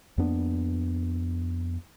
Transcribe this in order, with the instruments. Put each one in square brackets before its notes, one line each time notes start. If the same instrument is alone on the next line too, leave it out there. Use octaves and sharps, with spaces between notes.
[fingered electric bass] F2 A#3 B3 D4